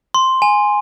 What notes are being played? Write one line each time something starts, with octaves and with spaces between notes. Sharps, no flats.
C6
G#5